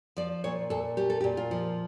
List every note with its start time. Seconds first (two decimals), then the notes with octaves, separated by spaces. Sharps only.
0.17 F3 D5
0.44 A#2 C#5
0.70 A#2 A4
0.97 A3 G4
1.10 A4
1.21 G4
1.24 A#2
1.37 F4
1.51 F3